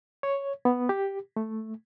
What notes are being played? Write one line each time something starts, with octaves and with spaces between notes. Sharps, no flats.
C#5
B3
G4
A3